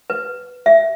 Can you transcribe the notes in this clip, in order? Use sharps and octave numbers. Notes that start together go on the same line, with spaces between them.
B4
E5